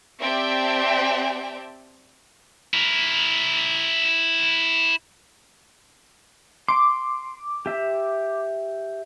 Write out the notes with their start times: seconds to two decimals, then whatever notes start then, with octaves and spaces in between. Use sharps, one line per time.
0.21 C4 G4 D5 E5 G5 A5
2.74 E4 A#4
6.68 C6 D6
7.66 G4 E5